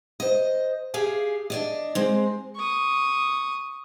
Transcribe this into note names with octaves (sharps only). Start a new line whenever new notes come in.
C5 D#5
G4 G#4 F5 G#5
D4 D5 D#5
G#3 C4
C#6 D#6